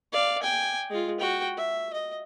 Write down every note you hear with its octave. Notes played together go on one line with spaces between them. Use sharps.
D5 F5
G5 G#5
G#3 F4
F#4 G5
E5
D#5